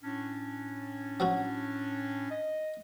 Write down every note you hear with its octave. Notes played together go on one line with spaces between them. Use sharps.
A2 C#4 D4
F#3 C4 F#4
D#5